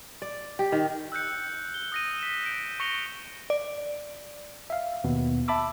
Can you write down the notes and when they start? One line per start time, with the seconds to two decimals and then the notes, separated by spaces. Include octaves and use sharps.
0.22 D5
0.59 G4
0.72 D#3
1.12 E6 F#6 G6 C#7
1.74 G7
1.92 D#6 A#6 D#7
2.19 B6 E7
2.44 G6 D7
2.80 C#6 A#6 C#7 F7 G7
3.50 D5
4.70 E5 F5
5.04 D#2 B2 B3
5.48 E5 A5 B5 D6 E6